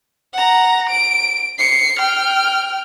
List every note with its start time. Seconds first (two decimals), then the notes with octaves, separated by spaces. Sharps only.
0.33 F#5 A#5
0.90 D7
1.58 C7 C#7
1.99 G5 F6